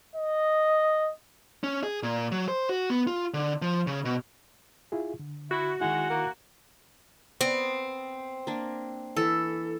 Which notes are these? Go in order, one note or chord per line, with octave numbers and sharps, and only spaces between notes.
D#5
C#4
G#4
A#2
F#3
C5
F#4
B3
F4
D3
F3
C#3
B2
E4 F4 G#4
D3
E4 F#4
D#3 G#3 E4 F#5
A#3
B3 C4
A#3 D4
E3 A4